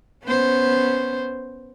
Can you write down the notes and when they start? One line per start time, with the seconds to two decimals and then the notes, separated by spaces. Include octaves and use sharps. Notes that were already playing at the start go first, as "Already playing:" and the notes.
0.24 B3 C#4 C5